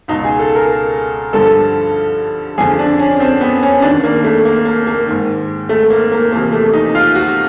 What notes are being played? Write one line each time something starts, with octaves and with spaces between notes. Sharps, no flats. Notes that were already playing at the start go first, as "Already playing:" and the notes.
C#2 B2 D#4
G#4
A4
A#4
G2 D3 F3 A4
F2 D3 F3 G#4
D4
C#4
C4
B3
C#4
D#2 D#3 D4
A#3
A3
A#3
A#3
A#3
G#2 D#3
A3
A#3
A#3
E2 C3 F3 A#3
A3
D#4
F4
F#4